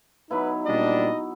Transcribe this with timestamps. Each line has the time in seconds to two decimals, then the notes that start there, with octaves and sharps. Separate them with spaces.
0.31 F#3 B3 D#4 E4 B4
0.66 A#2 G3 D4 D#5